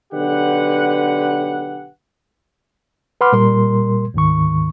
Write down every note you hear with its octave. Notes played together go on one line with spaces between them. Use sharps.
B1 D3 G4 B4 F#5
B4 F#5 B5 C6 D6 F6
A#2 G3 A#4 C6
D2 G#2 D#3 C#6